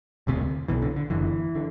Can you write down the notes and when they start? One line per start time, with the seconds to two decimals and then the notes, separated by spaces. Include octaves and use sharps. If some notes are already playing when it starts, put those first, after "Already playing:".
0.27 E1 D2 C3
0.68 B1 B2 E3
0.82 D3
0.96 D3
1.10 F#1 F#2 D3 E3
1.55 D3